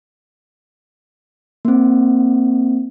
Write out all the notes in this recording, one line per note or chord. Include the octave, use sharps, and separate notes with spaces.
A#3 C4